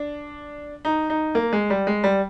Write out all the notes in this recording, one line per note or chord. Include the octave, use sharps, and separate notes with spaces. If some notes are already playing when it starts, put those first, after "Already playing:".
Already playing: D4
D#4
D#4
A#3
G#3
G3
G#3
G3